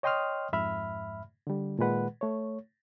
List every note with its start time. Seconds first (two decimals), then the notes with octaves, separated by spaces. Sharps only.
0.03 C#5 D#5 G5 C6 D#6 F6
0.53 F2 G#2 E5 B5 F6
1.47 D3 G3
1.79 A#2 D#3 G#3 B4 F#5
2.21 A3 C#5